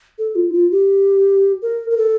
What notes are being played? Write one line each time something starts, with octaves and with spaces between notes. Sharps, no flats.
A4
F4
E4
F4
G4
A#4
A#4
A4